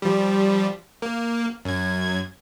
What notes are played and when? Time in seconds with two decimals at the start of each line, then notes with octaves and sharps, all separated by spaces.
0.02 F3 G3
1.02 A#3
1.65 F#2 G#6